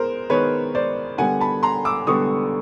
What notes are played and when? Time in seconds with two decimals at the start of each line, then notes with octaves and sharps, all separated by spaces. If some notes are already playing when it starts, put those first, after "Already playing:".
Already playing: G#3 B3 A#4 C5
0.30 D#3 G#3 B3 B4 C#5
0.75 C5 D5
1.18 D3 G3 B3 F#5 G#5
1.40 A5 B5
1.63 A#5 C6
1.85 D6 E6
2.07 D3 G3 B3 C#6 D#6